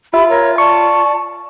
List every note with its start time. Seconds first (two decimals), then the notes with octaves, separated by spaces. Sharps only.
0.14 F4 G4 E5 B5
0.29 A#4 C#5
0.58 D5 A5 C#6